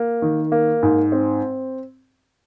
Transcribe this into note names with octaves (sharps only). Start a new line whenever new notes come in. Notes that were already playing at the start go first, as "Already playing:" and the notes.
Already playing: A#3
D#3
A#3
G#2
C4